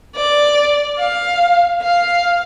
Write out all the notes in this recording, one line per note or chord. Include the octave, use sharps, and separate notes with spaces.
D5
F5
F5